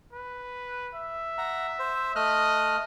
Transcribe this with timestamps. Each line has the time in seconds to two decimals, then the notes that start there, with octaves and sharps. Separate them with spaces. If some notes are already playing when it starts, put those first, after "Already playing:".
0.13 B4
0.95 E5
1.38 F#5 A#5
1.79 C5
2.16 A3 D#5 F6 F#6